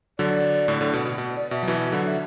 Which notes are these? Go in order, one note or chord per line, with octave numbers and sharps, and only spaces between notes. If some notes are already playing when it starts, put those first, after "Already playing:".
D3 F#3 D5
A2 D3
A2 D3
B2
B2
B2
D5
B2 E5
F#3
B2 E3 E5
E5
D3 F#3 F#5
E5